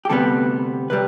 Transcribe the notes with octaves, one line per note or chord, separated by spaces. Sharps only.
G4
D2 C3 G3 B3 A4
C3 G3 B4